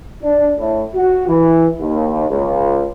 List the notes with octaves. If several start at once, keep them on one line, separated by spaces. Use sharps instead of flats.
D4
A2
F#4
E3
D#2
C#2